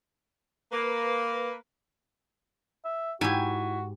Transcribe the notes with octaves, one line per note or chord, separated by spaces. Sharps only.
A#3 B4
E5
G#2 E4 F#4 G4 G#5